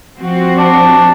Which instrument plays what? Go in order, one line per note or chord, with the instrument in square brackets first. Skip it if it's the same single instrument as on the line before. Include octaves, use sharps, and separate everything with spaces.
[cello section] F3 C4 F#4
[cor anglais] D4